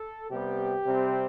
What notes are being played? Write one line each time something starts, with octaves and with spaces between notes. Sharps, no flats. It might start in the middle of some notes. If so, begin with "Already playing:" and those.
Already playing: A4
C3 G3 B3 G4
C3 G3 C4